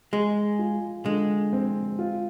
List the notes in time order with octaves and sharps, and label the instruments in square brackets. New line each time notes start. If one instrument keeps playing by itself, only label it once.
[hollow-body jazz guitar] G#3 [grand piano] G#4
[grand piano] F4
[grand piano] D3 [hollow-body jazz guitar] G#3
[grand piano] C4
F4